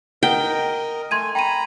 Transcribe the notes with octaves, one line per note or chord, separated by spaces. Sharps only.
A#4 D#5 F#5 G5
A3 G#5 C6 G#6 D#7
G5 A#5 B5 D#7